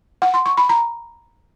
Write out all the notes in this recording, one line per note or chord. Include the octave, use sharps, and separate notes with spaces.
F#5
C6
C#6
B5
A#5